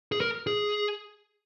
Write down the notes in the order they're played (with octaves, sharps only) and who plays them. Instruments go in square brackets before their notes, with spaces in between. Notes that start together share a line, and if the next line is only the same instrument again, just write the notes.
[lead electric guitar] G#4
A#4
G#4